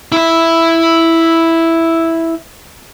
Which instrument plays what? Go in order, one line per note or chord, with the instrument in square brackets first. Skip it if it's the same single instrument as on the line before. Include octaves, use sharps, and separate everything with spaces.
[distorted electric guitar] E4 E5